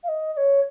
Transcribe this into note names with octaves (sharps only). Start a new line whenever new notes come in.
F5
D#5
D#5
C#5